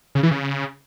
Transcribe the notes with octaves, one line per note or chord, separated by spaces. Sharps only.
C#3
E3
C#3